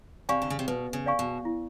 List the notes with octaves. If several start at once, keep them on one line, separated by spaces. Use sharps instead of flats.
C3 D5 F5 G#5 C#6
D3
C#3
C3
B2 B4
C#3
D5 F5 G#5 C#6
B2
E4